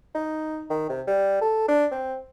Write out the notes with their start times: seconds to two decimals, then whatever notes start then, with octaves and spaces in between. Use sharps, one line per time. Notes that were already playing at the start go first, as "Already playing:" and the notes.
0.15 D#4
0.70 D#3
0.89 C3
1.07 G3
1.41 A4
1.69 D4
1.91 C4